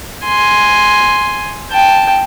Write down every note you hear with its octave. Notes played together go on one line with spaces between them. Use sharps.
G#5 C6
G5 A5